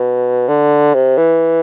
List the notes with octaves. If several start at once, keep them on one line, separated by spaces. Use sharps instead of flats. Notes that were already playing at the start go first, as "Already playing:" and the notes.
Already playing: B2
D3
C3
E3